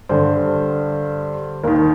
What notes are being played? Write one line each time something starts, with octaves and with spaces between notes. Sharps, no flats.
G2 D3 C5
D#2 D#3 A#4